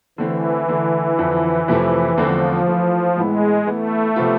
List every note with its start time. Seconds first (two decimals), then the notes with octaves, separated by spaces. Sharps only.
0.18 D3 E3 A3 C4 E4
0.68 D3 A3 E4
1.18 F2 D3 F3
1.68 F2 C3 F3 A3 E4
2.17 E2 D3 F3 A3 C4 E4
2.67 E3 A3 E4
3.17 A2 E3 G#3 B3 E4
3.66 E3 A3 B3 E4
4.16 C3 F3 B3 F4